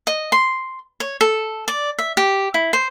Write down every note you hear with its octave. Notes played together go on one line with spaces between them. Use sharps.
D#5
C6
C#5
A4
D5
E5
G4
E4
C5